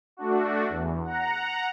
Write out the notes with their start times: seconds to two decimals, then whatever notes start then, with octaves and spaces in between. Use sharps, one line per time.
0.17 A3 D4 F#4
0.69 E2
1.04 F#5 A#5